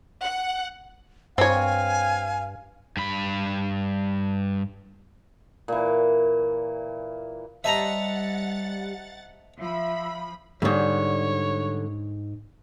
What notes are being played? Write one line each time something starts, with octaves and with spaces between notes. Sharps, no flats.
F#5
G2 C4 C#5 F5 G#5
G2 B5
A#2 E3
G3 C5 D#5 E5 F#5 A5 A#5 A6
F3 E5 B5
F2 G#2 D3 G3 D4 C#5 D5